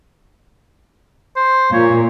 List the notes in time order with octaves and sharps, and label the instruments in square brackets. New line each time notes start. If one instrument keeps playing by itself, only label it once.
[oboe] C5
[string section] A#2 [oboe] C#5